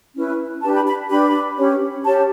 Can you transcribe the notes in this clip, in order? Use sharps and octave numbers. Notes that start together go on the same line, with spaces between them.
C#4 E4 B4
D4 G4 B4 A5
B5
B5
D4 G4 B4 B5
C#4 G4 C#5
C#4 G4 C#5 A5